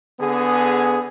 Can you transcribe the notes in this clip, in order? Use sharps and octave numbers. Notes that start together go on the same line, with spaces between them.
D3 B3 G#4